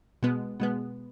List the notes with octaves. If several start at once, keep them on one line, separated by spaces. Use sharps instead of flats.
B2 G#3 B3
B2 G#3 B3